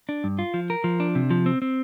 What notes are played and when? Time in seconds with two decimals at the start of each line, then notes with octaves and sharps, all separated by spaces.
0.09 D4
0.24 G2
0.39 F4
0.54 F3
0.70 A#4
0.84 F3
1.00 D4
1.15 C3
1.31 F3
1.46 C4
1.62 C4